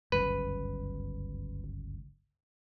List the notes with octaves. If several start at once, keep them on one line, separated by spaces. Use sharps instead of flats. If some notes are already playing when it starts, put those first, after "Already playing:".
G1 C#2 F#2 B4